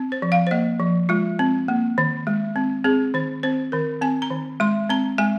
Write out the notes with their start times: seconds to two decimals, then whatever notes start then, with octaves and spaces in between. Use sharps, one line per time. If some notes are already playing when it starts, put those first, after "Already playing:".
Already playing: C4
0.12 C5
0.22 F3
0.32 F5
0.47 C5
0.51 A#3 D#5
0.80 F3
1.09 G#3 F4
1.39 C4
1.68 A#3
1.98 D#3
2.27 G#3
2.56 C4
2.84 C4 G#4
3.14 D#3 C5
3.43 C4 C5
3.72 D#3 A#4
4.02 C4 G#5
4.22 A#5
4.31 D#3
4.60 G#3 C6
4.90 C4 A#5
5.18 G#3 G#5